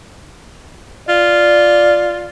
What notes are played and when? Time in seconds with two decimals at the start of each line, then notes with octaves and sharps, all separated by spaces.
1.09 F4 D5